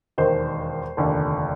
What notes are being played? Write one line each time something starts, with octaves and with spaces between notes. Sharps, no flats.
E1 D#2 D#3 C5
F1 D#2 D3